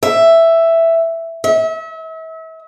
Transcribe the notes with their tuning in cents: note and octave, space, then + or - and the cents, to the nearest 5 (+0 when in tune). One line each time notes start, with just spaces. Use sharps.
E5 +5
E5 -35